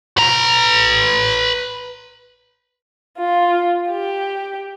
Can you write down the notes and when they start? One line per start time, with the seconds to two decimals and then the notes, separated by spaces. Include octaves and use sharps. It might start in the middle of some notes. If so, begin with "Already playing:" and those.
0.18 B4 A#5
3.19 F4
3.90 G4